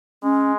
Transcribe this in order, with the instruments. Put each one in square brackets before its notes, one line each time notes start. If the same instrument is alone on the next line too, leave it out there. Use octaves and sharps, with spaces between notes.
[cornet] G#3 [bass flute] C#4